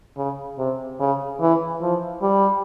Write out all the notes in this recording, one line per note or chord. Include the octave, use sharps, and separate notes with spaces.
C#3
C3
C#3
E3
F3
G3